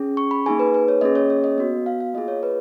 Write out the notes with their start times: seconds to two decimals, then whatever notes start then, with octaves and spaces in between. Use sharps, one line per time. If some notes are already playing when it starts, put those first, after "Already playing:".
Already playing: C#4 G#4
0.17 C#6
0.31 B5
0.46 A#3 D#4 G#4 G#5
0.59 B4
0.74 B4
0.88 C#5
1.01 A#3 C#4 G#4 D#5
1.15 C#5
1.30 C#5
1.44 D#5
1.58 B3 F#4
1.86 F5
2.00 F5
2.14 A#3 F4 G#4 D#5
2.28 C#5
2.43 B4